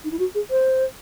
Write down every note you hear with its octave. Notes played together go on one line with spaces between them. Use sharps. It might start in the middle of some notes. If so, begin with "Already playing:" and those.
D#4
E4
F#4
G#4
C5